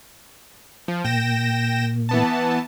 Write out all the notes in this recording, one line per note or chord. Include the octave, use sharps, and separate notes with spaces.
F3
A#2 G5 A#6 E7
E3 B3 A5